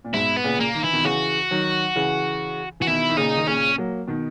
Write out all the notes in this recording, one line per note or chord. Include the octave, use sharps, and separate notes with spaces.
A#2
G#2 B2 E4
B3
A#2 C#3
A#3
D#3
E3 E4
B2 D#3
C#3 E3 F#4
D#3 F#3
C#3 E3
E3 F#4
B2 D#3 E4
D#3
A#2 C#3 D#4
D#3
A#2 C#3 C#4
F#3 A#3
B2 D#3